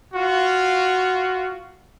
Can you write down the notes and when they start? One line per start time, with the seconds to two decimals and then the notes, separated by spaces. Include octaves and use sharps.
0.14 F4 F#4